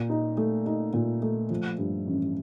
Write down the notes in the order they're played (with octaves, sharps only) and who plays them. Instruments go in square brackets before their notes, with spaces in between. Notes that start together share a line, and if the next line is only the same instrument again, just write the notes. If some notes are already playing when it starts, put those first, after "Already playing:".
Already playing: [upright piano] A#2
D#4
A3
D#4
A#2
A3
F3
G2
A1